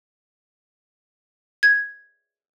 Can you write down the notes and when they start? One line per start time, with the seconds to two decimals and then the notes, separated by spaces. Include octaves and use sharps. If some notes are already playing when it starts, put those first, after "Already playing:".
1.63 G#6